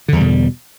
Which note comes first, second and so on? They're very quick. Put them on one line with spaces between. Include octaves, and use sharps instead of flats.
D3 E2 G3 B2